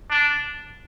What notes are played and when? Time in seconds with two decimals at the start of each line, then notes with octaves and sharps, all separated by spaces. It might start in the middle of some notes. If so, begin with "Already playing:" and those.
0.10 D4